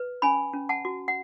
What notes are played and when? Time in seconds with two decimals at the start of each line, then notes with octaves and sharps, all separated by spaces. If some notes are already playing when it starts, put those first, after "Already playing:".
Already playing: B4
0.22 C#4 G#5 B5
0.53 C#4
0.69 F#5 A5
0.85 F#4
1.08 F#5